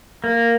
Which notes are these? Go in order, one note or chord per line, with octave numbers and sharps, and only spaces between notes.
A#3